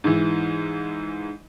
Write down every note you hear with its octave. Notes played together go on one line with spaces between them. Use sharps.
G#2 E3